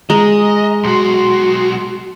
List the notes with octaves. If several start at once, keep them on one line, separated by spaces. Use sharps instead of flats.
G#3 D#5 A#5
B1 F#4 C6